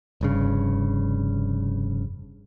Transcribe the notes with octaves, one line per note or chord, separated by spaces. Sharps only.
F1 G2 C#3